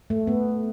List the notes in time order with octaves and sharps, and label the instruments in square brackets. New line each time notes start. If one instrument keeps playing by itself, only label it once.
[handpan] A3
B3